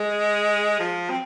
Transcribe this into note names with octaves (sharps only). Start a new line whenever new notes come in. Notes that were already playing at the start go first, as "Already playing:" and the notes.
Already playing: G#3
F3
C4